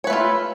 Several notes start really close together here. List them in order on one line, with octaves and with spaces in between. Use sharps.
C#5 B4 A3 F4